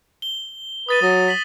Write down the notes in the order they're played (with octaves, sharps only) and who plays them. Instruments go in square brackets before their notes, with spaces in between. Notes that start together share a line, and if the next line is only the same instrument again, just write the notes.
[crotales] G7
[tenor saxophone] B4 [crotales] D#6 A6 D#7
[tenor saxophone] F#3 [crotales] D#6 A#6
[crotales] B6 F#7